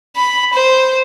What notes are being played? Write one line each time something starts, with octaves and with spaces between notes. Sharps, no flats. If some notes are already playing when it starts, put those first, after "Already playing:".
B5
C5